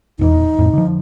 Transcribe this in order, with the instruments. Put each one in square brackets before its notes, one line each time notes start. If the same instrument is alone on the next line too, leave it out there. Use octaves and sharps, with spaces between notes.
[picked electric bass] D#1 E2 E3 [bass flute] D#4
[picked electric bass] F2 A2
D3 F3